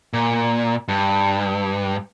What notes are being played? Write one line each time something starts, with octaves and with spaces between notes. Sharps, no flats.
A#2
G2